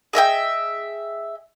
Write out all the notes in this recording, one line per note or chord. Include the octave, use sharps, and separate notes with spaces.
G#4 D#5 E5 G5